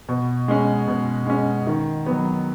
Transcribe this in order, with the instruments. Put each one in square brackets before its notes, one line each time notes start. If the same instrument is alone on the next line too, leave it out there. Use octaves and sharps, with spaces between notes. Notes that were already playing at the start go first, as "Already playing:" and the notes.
[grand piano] B2
G#3 C#4
B2
G#3 C#4
D#3
F#3 B3